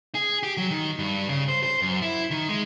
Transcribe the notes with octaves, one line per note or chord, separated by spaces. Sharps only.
G#4
G4
F#3
D#3
G2
C#3
C5
C5
F#2
E4
D#3
G#3